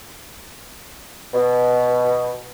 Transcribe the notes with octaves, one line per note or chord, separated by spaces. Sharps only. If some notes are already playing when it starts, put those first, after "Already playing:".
B2